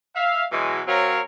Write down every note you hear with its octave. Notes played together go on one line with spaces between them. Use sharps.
E5 F5
B2 E3 F#3 G#3
F#3 C4 A#4 C#5 F5